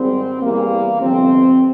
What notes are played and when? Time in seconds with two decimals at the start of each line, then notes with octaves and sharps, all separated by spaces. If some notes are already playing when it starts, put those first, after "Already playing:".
Already playing: G#1 G#2 G3 C4
0.41 E2 E3 G3 A#3
1.00 G1 F2 C3 F3 C4